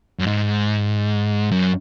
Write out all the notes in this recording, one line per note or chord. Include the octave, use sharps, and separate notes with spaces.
F#2
G#2
F#2